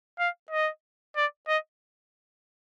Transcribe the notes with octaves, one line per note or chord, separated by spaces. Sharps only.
F5
D#5
D5
D#5